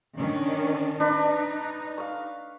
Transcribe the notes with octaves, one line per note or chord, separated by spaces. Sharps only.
D#3 C#4 D4
D4 D#4 B4
F5 C#6